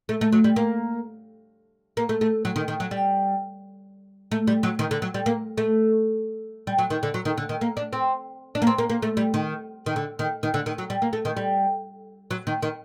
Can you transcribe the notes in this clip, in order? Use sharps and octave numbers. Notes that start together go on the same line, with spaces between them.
A3
A3
F#3
G3
A#3
A#3
A3
A3
F#3
D#3
D#3
F#3
G3
A3
G3
F#3
D#3
D3
F#3
G3
A#3
A3
G3
F#3
D#3
D3
F#3
D#3
D3
D#3
A#3
D4
C4
D4
A#3
C4
A#3
A#3
A3
G3
D#3
D#3
D3
D#3
D#3
D3
D#3
F#3
G3
A#3
A3
D#3
G3
F#3
D#3
D#3